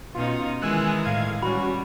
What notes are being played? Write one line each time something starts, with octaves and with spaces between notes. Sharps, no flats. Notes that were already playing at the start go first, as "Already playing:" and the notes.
B2 C#4 D#4 F4
D#3 E3 G#3 G#5 E6 F#6
A2 F5 G#6
G3 C#4 F#4 B5